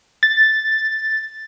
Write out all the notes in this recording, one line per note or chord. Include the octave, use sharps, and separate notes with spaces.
A6